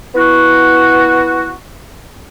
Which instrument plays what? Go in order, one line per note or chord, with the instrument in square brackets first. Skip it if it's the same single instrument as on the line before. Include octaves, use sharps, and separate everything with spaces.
[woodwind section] B3 E4 F#4